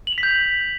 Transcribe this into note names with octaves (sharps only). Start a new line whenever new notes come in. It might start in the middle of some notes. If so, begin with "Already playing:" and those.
F#7
F7
B6
G6